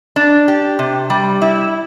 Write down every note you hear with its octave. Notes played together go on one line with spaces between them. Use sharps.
D4
G4
C3
G3
E4